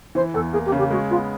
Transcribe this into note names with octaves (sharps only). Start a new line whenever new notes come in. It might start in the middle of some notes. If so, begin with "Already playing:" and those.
E3 C5
E2 A4
A#3 G#4
G4
C#3
G4
G#3 F#4
B3 F4